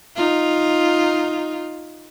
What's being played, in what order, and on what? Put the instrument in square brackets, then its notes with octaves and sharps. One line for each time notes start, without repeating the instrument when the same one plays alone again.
[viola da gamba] D#4 F4